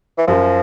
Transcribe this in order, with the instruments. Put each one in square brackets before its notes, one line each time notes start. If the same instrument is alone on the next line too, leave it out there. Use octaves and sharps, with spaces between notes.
[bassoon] E3
[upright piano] F#2 [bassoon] F3